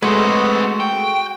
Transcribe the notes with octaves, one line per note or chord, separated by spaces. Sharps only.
G#3 A3 C4 F#4 B4 D#5 F#5
F#4 G5